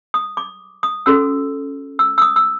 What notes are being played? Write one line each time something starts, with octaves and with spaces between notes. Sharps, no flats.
D#6
D6
D#6
C#4 F#4 A4 E6
E6
E6
D#6
E6